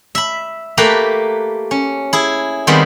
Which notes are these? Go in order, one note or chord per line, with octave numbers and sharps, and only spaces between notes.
E5 B5
A3 A#3 G4 B4 A#5 B5
C#4
E4 G#4
D#3 G3 G#3 B3 C4